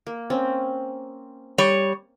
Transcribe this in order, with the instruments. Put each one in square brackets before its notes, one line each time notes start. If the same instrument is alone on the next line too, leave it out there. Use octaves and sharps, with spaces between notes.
[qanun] A#3
C4 C#4
[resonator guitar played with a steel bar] G3 C#5